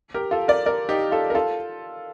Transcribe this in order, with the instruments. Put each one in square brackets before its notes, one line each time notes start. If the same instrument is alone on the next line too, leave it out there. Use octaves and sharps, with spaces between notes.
[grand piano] G4 A#4
F4 A4
A#4 D5
A#4 D5
D#4 G4
F4 A4
A#4
F4 A4